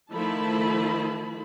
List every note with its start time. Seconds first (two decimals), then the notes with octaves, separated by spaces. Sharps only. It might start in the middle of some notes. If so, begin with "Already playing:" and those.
0.13 D#3 F3 A3 E4 A5 B5